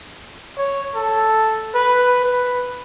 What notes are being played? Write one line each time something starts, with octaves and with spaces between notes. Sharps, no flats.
C#5
A4
B4
B4